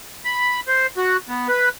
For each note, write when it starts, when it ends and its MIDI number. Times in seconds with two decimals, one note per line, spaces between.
0.25 0.60 83
0.68 0.87 72
0.97 1.17 66
1.29 1.48 59
1.48 1.69 71